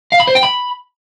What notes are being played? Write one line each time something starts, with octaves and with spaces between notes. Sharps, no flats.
F5
B5
C5
G5
B5